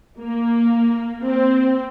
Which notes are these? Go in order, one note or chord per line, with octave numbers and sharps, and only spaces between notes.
A#3
C4